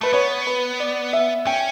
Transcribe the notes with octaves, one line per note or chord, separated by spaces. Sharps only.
A3 B4
B3 C#5
B4
D5
E5
C#4 G5